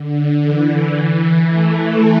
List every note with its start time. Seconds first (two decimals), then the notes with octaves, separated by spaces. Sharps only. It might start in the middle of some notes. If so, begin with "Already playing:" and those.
Already playing: D3
0.43 E3
1.46 A3